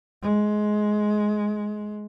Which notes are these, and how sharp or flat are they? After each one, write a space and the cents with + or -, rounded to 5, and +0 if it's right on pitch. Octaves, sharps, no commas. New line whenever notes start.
G#3 +15